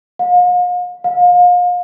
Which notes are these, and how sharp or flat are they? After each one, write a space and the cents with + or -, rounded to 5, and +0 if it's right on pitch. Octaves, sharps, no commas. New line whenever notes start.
F5 +45
F5 +35